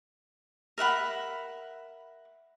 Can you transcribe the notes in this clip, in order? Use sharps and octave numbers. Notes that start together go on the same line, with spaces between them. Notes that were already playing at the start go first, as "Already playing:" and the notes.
A#4 E5 F#5 B5